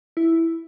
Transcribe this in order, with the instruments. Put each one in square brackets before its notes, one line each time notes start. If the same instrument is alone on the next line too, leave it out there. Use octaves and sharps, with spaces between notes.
[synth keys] E4